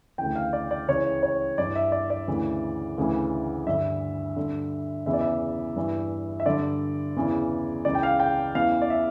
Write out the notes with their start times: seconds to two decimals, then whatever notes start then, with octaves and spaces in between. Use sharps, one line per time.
0.18 D2 C#3 E3 G5
0.36 F5
0.53 D5
0.71 D5
0.88 C#2 C#3 E3 C#5
1.23 C#5
1.58 G2 E3 D5
1.76 E5
1.92 D5
2.10 D5
2.28 D2 C#3 E3
2.98 D2 C#3 E3
3.67 G2 D3 E5
4.36 G2 D3
5.06 E2 C#3 E3 E5
5.13 D5
5.21 E5
5.76 G2 E3
6.40 E5
6.46 G2 D3 D5
7.16 E2 C#3 E3
7.85 C#2 C#3 E3 D5
7.95 G5
8.03 F5
8.20 G5
8.55 E2 C#3 E3 F5
8.82 D5
8.90 E5